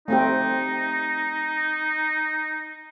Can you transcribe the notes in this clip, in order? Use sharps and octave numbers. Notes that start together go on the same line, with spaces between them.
A3 C4 D#4 G4